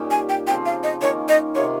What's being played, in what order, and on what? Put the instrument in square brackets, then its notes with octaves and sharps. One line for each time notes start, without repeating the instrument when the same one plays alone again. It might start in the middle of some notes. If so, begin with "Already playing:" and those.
Already playing: [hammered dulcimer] A#2 G3 A#3 C#4 D#4 G4
[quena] G#5
G5
[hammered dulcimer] C#3 F3 C4 F4 [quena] G5
[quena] F5
D#5
[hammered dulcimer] D#3 A#3 C#4 [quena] C#5
[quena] D#5
[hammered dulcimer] C3 D#3 A#3 F4 [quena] C#5